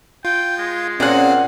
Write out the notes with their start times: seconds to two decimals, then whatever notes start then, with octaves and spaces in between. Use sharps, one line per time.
0.25 F4 G5
0.58 G#3
1.00 A#2 C4 C#4 G#4 F5 F#5